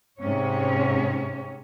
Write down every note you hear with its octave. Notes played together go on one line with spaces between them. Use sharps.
G#2 C3 C#4 C#5